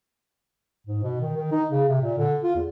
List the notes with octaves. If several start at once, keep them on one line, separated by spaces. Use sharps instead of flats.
G#2
B2
D#3
D#3
D#4
C#3
C3
A#2
D3
F4
E2